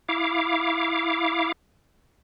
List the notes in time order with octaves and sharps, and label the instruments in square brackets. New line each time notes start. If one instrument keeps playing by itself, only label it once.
[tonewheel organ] E4 F5 D6